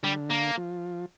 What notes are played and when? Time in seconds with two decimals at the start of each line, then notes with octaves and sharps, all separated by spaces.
0.03 D3 G3
0.30 A#3
0.57 F3